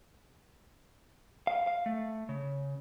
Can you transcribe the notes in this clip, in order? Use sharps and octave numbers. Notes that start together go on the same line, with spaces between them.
F5
F5
A3
C#3